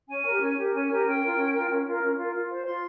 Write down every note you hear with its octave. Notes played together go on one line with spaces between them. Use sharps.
C#4 G#5
G4 A#4
C#4
G4 A#4
C#4 G#5
G4 A#4
C#4 G5
F4 A#4
C#4
F4 A#4
C#4
F4 A#4
C#4
F4 A#4
F4
C5
F4 C6